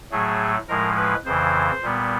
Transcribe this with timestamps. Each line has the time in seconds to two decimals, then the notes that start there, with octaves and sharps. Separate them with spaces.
0.11 A2 F#3 A3 G#4
0.68 A2 F3 G#3 A#4
0.96 B4
1.25 F2 C#3 E3 C5
1.82 A#2 G3 B3